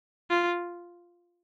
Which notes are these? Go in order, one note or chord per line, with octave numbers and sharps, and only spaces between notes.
F4